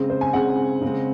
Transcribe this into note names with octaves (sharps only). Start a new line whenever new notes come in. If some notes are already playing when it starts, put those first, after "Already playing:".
Already playing: C#3 G#3 C4
C5
G#5
C#3 G#3 C4 F#5
C#3 G#3 C4